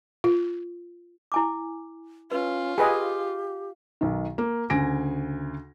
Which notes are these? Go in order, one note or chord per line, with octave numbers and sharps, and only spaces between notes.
F4
E4 G#5 D6
C#4 F4 B4
G4 G#4 B4 D#5 G5 G#5
B1 D#3
A#3
D2 C#3 G#5 A#6 D7